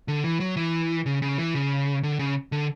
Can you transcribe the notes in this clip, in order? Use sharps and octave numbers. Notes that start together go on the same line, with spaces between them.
D3
E3
F#3
E3
C#3
C#3
E3
C#3
D3
C#3
D3